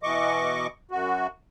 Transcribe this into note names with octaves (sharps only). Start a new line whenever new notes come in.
B2 E3 D#5 C#6 D6
F#2 F#4